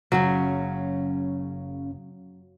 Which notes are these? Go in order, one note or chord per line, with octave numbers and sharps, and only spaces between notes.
F#1 C#3 F#3 C#4